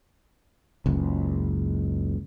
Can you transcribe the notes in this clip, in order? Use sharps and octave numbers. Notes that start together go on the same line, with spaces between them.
F#1 C#2